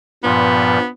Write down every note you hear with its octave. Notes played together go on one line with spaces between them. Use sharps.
G2 A#2 F3 B3